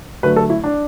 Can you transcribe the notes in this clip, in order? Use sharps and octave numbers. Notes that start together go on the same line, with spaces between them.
D3 F#3 A3 B4
A4
E4
D4